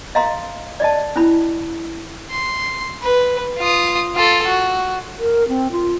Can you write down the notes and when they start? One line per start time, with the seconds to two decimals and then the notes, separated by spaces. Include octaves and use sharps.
0.15 D#5 F5 A#5 C6
0.80 D5 D#5 A5
1.16 C#4 E4 B5
2.31 C6
3.02 B4
3.58 F4 D#6
4.16 F4 A4
4.47 F#4
5.19 A#4
5.48 C4
5.72 F4